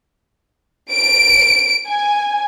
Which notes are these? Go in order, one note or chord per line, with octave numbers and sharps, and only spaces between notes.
D7
G#5